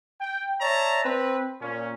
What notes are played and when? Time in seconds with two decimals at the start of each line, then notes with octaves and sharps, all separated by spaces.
0.21 G5
0.61 C#5 D5 E5 A5 A#5
1.04 C4 B4
1.61 A#2 C#4